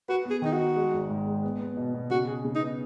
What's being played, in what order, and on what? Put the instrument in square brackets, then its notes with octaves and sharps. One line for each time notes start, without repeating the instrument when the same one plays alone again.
[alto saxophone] F#4 [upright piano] B4
[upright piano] B3
[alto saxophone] G#4
[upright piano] D#3 [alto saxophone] D#4
[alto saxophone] F#4
[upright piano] D#4
G#3
G#1
G#2
G#3
B3
B3
B2
B2
[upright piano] C#3 [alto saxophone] F#4
[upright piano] G#4
C#3
[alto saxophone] D#4
[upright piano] B3